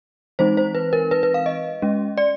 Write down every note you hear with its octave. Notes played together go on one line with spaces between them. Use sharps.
E3 G#3 C4 D#4 C5
C5
B4
A#4
B4
B4
F5
D#5
G#3 C#4
D5